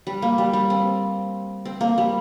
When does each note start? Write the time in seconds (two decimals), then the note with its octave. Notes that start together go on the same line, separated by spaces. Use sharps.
0.07 G3
0.22 A#3
0.38 G3
0.53 G3
0.70 C4
1.65 C4
1.81 A#3
1.98 G3